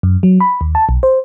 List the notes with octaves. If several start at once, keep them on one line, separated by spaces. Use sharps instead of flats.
F#2
F#3
B5
D#2
A5
B1
C5